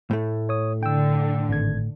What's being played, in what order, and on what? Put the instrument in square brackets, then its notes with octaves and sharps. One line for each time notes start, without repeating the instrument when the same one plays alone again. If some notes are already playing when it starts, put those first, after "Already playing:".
[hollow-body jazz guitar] A2 A3
[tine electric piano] C#5 D#6
[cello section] D3 [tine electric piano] G5 E6
[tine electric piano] G#1 G#6